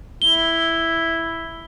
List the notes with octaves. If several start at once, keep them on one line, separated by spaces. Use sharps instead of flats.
E4 G7